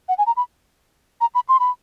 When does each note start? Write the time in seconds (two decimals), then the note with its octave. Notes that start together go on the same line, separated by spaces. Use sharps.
0.09 F#5
0.18 G#5
0.26 A#5
0.37 B5
1.21 A#5
1.35 B5
1.49 C6
1.60 B5